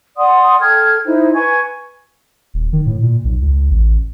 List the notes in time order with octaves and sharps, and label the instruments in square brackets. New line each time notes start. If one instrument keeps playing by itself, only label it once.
[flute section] D5 F#5 C6 D#6
A4 G5 F6 G#6
D#4 E4 C5
B4 G#5 C#6 G#6
[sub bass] D#1
D#3
A2
A#2
B1
C#2
A1